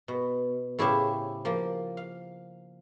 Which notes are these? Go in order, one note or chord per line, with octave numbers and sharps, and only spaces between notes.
B2
A2 C#3 E4 G4 C5 E5
F3 A#3
F5